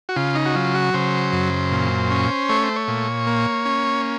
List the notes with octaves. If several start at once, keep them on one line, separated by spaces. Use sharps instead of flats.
F#4
C#3 F4
D#4
F#4
F#3 F4
F#4
C#3 C5
F#2
A#2
C#4
A3 C#5
C5
C#5
A#2
A#3
C#4